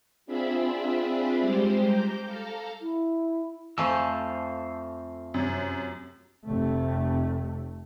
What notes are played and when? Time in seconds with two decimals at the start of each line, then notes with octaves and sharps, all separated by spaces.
0.26 C4 D4 F4 G#4 E5 B5
1.39 G3 G#3 G4 C5
1.81 A#5 D6 G6
2.24 A4 F5 A#5
2.80 E4
3.78 F2 A3 C5 F5 G#5 E6
5.34 F#2 C3
6.46 F1 C3 A3